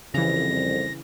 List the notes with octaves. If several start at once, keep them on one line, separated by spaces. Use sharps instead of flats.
C2 F2 C#3 E3 A#6